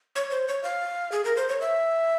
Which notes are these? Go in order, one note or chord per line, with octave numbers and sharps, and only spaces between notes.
C#5
C5
C#5
F5
G#4
A#4
C5
C#5
E5